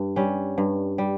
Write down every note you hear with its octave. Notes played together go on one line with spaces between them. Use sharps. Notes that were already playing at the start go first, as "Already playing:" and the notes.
Already playing: G2
G3 C#4
G2
G3